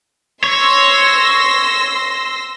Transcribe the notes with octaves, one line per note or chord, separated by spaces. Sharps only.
C#5 C6 E6 A#6